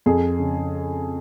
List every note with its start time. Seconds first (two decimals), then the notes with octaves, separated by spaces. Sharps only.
0.06 F2 G#4
0.39 C#3